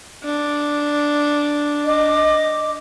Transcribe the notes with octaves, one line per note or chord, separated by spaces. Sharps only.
D4
D#5 D6